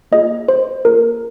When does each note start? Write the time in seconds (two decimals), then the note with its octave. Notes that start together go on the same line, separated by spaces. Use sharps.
0.12 A#3 F4 G#4 D#5
0.48 C5
0.85 A#3 F4 G#4 A#4